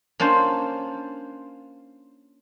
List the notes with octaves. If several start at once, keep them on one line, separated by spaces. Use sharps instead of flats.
A#3 C#4 D4 F4 C5